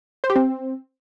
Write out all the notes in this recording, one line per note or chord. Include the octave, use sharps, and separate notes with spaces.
C5
G4
C4